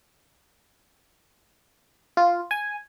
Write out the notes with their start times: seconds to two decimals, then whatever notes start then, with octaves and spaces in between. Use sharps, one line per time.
2.17 F4
2.51 G#5